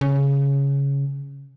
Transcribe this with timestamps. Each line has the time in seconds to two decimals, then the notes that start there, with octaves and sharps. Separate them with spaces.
0.01 C#3